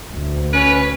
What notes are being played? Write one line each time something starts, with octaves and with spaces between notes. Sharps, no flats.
D2
C#4 B4